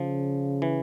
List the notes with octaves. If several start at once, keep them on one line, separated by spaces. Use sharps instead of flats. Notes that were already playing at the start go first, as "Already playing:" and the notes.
Already playing: C#3 F3
E3